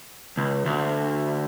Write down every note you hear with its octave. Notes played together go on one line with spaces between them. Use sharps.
C#2
D2